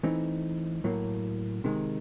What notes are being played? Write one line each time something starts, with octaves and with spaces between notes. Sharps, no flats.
E3 A3 C4 D#4
A2 F#3 A#3
C3 D#3 G#3